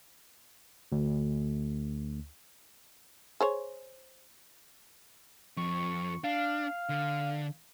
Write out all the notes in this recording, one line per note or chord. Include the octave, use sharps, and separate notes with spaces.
D2
G#4 C5 C#5
F2 C#6
D4 F5
D3